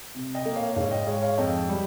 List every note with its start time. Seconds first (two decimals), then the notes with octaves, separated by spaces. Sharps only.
0.15 C3
0.35 D#5 G5
0.45 A#3
0.56 C#5 F5
0.76 G#2 C#5 F5
0.91 D#5 G5
1.07 G#3 C#5 F5
1.22 C#5 F5
1.38 F2 D#5 G5
1.69 G3